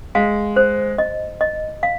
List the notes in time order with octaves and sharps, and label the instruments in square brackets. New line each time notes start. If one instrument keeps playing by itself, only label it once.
[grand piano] G#3 [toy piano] F5
[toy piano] C5
D#5
D#5
F5